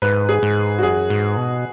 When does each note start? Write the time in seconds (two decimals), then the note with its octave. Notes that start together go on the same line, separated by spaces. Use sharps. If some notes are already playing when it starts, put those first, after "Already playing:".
0.02 G#2 B4
0.29 G#4
0.43 G#2
0.78 F#4
0.83 F#2 G#4
1.10 G#2
1.37 B2